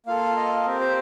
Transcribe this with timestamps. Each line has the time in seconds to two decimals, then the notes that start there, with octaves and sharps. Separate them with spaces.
0.06 A#3 F4 A4 F5
0.36 D#5
0.65 C4 G4 A#4
0.80 C5